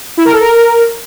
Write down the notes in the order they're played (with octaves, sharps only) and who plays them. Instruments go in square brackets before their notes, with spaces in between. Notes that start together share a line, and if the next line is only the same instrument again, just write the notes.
[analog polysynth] E4
A#4
A4
A#4